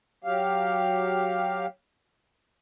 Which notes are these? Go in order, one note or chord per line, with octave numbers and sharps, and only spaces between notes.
F#3 G4 F5